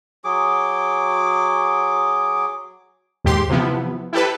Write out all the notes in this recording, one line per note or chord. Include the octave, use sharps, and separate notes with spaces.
F#3 G#4 D6
D#2 G#2 G4 C6
C3 E3 F3 B3 E4
E4 G4 A4 B4